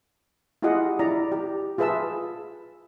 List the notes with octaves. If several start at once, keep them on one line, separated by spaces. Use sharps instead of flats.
E4 F4 G4 G#4 D#5 F#5
E4 D5 A#5
G4
F4 G#4 B4 E5 A5 E6